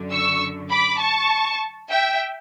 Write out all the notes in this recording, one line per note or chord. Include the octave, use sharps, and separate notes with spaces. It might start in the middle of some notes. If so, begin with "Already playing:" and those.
Already playing: F#2 D3
C#6 E6
B5 D6
A5 C#6
E5 G5